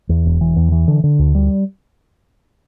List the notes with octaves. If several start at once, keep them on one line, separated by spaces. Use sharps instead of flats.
E2
E1
E3
E2
E3
D3
D3
D2
G3